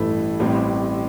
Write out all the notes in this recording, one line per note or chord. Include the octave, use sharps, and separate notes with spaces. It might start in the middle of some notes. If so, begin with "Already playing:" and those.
Already playing: A1 G2 E3 A3 E4
A1 A2 G3 C4